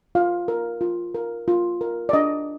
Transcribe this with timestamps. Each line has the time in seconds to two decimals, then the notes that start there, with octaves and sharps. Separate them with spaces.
0.15 F4 F5
0.48 A#4
0.81 F4
1.15 A#4
1.48 F4
1.81 A#4
2.09 D5
2.13 D4 D#5